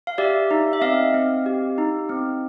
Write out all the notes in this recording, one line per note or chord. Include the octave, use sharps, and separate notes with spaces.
F5
G4 D5 E5
D#4
E5
C4 D#5 F5
C4
G4
D#4
C4